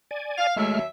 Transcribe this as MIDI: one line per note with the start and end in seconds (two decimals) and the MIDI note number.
0.11 0.47 74
0.11 0.47 80
0.38 0.52 77
0.56 0.83 39
0.56 0.83 54
0.56 0.79 56
0.56 0.79 57
0.56 0.83 76
0.56 0.79 89